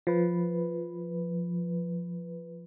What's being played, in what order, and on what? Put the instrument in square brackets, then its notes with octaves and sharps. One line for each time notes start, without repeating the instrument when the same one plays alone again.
[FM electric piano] F3 B4